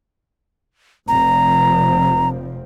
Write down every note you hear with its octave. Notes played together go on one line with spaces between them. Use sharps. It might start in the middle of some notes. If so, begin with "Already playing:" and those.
F1 F3 C4 A#5